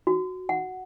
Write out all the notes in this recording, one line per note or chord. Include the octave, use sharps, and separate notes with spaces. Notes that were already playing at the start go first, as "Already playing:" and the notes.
F#4
F#5